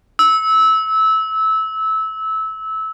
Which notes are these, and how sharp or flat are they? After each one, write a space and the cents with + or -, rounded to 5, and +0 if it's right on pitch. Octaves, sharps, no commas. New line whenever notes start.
E6 -20